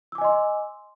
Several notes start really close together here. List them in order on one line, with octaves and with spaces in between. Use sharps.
E6 D6 G#5 D#5 C6